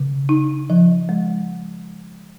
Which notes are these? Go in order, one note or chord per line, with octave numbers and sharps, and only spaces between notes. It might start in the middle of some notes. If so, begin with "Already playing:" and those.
Already playing: C#3
D#4
F3
G#3